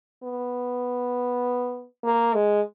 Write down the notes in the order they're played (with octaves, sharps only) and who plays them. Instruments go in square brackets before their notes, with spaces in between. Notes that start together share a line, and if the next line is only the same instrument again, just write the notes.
[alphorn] B3
A#3
G#3